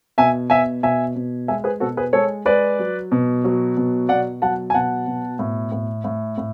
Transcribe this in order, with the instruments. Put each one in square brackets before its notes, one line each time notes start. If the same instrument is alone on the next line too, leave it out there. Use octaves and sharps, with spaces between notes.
[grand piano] B2 E5 G#5
B2 E5 G#5
B2 E5 G#5
B2
G#3 E5 G#5
G#4 B4
B2 F#4 A4
G#4 B4
G#3 A4 C#5
G#3 B4 D5
F#3
B2
F#3
B2
B2 D5 F#5
F#3 F#5 A5
G#5
B2 F#5 A5
B2
A2
A2
A2
A2